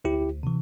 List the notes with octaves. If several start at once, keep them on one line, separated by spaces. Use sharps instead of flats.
D2 E4 G4
C3 E3